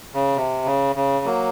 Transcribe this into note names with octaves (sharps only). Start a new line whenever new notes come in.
C#3
C3
C#3
C#3
F#3 A#3